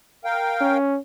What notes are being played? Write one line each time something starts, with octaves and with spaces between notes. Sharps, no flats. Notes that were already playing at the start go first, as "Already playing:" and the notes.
A#4 F5 G5
C#4